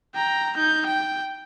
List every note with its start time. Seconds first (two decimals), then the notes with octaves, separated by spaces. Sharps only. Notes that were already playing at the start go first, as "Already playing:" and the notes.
0.15 G5 A#5
0.57 D#4 G6
0.86 G5